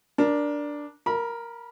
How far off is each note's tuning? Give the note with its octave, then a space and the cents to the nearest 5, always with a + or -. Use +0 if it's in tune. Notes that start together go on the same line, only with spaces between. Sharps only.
D4 +0 A#4 +20
A#4 +0 B5 -30